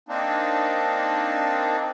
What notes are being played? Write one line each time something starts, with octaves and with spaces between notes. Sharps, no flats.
A#3 C4 D4 D#4